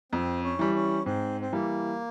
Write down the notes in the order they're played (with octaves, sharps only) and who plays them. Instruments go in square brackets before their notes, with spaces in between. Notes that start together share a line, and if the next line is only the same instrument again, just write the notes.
[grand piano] F2 [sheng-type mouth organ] C4
[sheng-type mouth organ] C#4
[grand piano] E3 G3
[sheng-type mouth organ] C#4
[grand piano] G#2 [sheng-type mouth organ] C4
[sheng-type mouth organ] C4
[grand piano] E3 G3 [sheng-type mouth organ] A#3